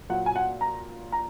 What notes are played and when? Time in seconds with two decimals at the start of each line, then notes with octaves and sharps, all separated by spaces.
0.10 A#2 F#3 F#5
0.26 G#5
0.36 F#5
0.61 A#5
1.12 A#5